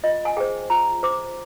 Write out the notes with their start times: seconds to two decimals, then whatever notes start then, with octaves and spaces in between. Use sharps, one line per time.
0.04 F4 D#5
0.25 G#5
0.37 G#4 C5 G5
0.70 F4 A#5
1.03 C5 D6